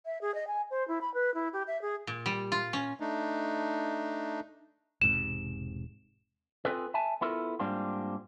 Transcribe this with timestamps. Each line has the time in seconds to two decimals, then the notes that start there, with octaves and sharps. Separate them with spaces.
0.06 E5
0.21 G#4
0.35 D#5
0.47 G#5
0.71 C5
0.88 E4
1.01 B5
1.14 B4
1.34 E4
1.53 G4
1.67 E5
1.82 G#4
2.07 A#2
2.26 G3
2.52 F4
2.73 C#4
3.00 A3 D4 D#4
5.02 E1 G#2 C3 E7
6.65 C4 F4 G#4 A4 B4
6.94 E5 G#5 A5
7.21 B3 E4 F4 A4 A#4
7.59 G#2 G3 A#3 C4 D4 F4